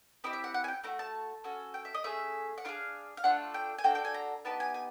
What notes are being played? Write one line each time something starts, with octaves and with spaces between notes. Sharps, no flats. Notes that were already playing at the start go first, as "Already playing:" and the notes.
C4 E4 G4 D#5
E5
F#5
F#5
G#5
G5
A3 D4 F#4 A#5
A5
C#4 F#4 A4
G5
E5
D#5
A3 C#4 G#4 E5
F#5
D4 F4 G#4 F5
F5
A3 D4 F4 A4 F#5
G5
G#5
D4 F#4 A4 G5
G5
G#5
A#5
B3 D#4 G4 A5
G#5
G#5